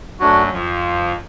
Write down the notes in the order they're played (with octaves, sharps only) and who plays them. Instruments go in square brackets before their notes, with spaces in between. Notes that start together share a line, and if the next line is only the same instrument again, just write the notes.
[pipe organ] F#2 F#3 [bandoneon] A3 D4 F#4
[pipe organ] F2 F3